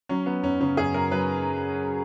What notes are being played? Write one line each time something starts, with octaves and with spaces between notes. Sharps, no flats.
F#3 C#4
F#3 B3
F#2 C#4
C#3 C#4
F#2 G#4
F#2 A#4
F#3 B4